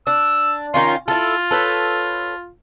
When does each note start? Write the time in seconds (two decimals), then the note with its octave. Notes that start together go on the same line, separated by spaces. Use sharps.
0.07 D4 E6
0.74 D#3 C#4 F4 C6
1.08 E4 F4 A4
1.51 A4 B4 C#5